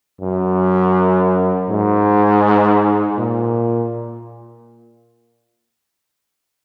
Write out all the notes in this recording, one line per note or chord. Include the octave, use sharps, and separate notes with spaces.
F#2
G#2
A#2